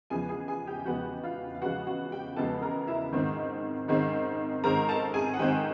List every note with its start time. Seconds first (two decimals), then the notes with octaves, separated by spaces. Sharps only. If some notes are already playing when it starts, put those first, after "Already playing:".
0.10 E2 C#3 F3 G#3 B3 G#4 G#5
0.29 G#4 G#5
0.48 G#4 G#5
0.67 G4 G5
0.79 G5
0.86 E2 C#3 F3 G#3 B3 F#4 F#5
1.23 F4 F5
1.55 F5
1.62 E2 C#3 F3 G#3 B3 F#4 F#5
1.87 F#4 F#5
2.12 G4 G5
2.36 E2 C#3 F3 G#3 B3 A4 A5
2.62 A#4 A#5
2.87 E4 E5
3.13 G#2 D#3 G#3 C4
3.88 G#2 D#3 G#3 C4
4.63 G#2 D#3 G#3 C4 A#4 A#5
4.88 A4 A5
5.14 G#4 G#5
5.34 F#5
5.39 G#2 D#3 G#3 C4 G4 G5